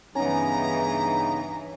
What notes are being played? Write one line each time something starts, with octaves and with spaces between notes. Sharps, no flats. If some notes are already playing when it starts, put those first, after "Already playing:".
G2 C#3 E3 B3 C#4 D#4 A#5